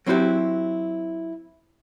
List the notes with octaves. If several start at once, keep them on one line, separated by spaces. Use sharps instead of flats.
F#3 C4 E4 F#4 G4